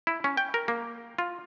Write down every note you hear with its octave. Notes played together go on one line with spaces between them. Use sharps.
E4
C#4
G5
A#4
A#3
F4